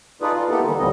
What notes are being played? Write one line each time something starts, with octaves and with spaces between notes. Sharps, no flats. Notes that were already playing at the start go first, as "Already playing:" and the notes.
D#4 F4 G#4 A4 B4 D5
F4
A#3 B3 D#4 E4 G4 A4
D#3 E3 G3 A#3
D2 A2 D3 G3 C4 D#5